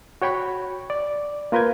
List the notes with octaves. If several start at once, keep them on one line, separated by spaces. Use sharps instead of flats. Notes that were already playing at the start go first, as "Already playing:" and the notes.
F#4 C#5 G5 B5 C#6
D5
A#3 F4 A#4 B4 G6 G#6